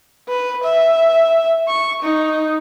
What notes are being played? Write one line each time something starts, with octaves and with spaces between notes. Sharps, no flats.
B4
E5
C#6
D#4